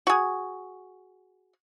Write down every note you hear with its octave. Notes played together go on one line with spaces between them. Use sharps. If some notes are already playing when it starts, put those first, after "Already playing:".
F#4 G#4